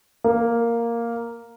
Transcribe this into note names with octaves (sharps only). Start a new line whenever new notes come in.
A#3